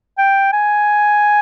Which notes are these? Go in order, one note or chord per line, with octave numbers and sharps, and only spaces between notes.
G5
G#5